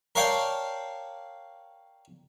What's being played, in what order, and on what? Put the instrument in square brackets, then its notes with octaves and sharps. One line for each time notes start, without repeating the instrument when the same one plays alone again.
[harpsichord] A#4 C#5 D5 F5 G5 A5